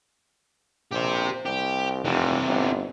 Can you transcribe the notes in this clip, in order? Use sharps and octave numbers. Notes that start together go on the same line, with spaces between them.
A#1 G4 C5
C2 G4
F1 C3 E3
G1